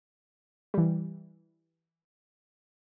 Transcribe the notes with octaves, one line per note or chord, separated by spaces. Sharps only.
E3 G3